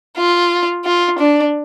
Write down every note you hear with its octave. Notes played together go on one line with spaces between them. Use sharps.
F4
F4
D4